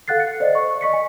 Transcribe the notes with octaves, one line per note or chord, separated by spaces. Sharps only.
A4 F5 F#5 F#6 A6 C7
C#7
C5 D5 D#5
C#6
D#5 C#6 B6 C#7
G#5